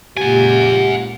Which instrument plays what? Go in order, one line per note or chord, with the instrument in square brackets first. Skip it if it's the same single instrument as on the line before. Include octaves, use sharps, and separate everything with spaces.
[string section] C#2 A#2 [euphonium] G4 [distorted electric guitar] F#5 G#5